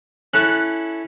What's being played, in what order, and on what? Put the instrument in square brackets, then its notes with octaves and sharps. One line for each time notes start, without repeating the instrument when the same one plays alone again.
[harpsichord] C#4 E4 A4 [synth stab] F#6